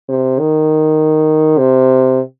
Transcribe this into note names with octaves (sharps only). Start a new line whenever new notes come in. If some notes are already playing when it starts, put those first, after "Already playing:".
C3
D#3
C3